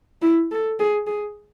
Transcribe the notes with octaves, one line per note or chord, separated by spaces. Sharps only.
E4
A4
G#4
G#4